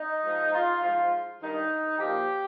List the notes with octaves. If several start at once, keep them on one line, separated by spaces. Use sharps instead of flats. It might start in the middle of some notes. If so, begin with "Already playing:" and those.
Already playing: D#4
G#2 F3
F4
G#2 F3 F4
G2 D#3 D#4
A#2 F3 G4